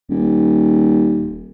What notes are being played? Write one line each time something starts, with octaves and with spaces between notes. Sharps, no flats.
D#1